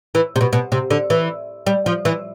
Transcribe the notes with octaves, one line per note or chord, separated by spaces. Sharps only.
E3
C3
B2
B2
C3
D3
E3
G3
F3
E3